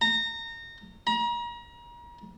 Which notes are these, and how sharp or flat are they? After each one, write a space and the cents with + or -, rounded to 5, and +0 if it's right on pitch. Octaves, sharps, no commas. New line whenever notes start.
A#5 -25
A#5 +35